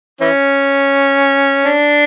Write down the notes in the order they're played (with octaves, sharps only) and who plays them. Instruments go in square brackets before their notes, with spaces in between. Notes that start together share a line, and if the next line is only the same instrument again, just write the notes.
[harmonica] E3 C#4
D4